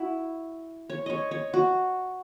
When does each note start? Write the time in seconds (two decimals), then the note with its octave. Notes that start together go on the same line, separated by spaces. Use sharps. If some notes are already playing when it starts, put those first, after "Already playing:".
Already playing: E4 F#4
0.90 C#5
1.06 C#5 D#5
1.31 C#5
1.54 F#4